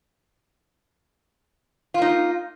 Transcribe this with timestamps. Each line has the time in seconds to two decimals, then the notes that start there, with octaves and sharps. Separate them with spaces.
1.94 F4
1.98 A#3
2.02 D#4